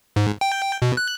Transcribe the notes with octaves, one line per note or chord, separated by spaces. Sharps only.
G#2
G5
B2
F#6